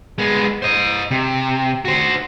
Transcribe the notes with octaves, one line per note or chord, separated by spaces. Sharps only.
G#3 B3
C5 D#5
C3
F#4 C5